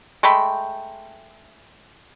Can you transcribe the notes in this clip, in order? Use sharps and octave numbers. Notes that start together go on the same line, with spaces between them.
G#3 A3 G5 B5